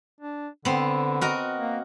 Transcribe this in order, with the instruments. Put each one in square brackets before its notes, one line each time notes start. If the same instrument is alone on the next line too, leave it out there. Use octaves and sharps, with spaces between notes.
[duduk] D4
[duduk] D3 [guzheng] B3 C4
[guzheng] F#4 A#4 D#5
[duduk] A#3